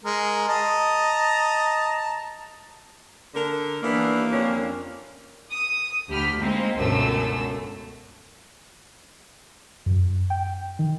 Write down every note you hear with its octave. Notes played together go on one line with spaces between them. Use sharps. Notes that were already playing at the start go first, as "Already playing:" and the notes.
G#3 A#4
D#5 A5 A#5
D3 A#4
E3 A#3 B3 D4
F2 C#4 D4
D#6
D2 G4 B5 F6
G#3 A#3 C4 D#4
G1 C#2 F#2 B2 A3 E6
F#2
G5
D#3